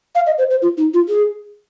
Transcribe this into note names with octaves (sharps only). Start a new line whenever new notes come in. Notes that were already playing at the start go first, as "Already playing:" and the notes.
F5
D#5
C5
C5
F4
D#4
F4
G#4